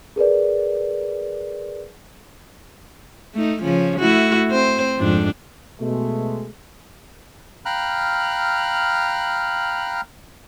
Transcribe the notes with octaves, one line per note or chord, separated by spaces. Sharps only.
G#4 A#4 B4 D5
A3 D#4
C#3 F3 C#4
A3 E4 F#4
C4 C5
F2 G#2 D4
B2 G#3 A3
F5 G5 A#5 B5 F6 F#6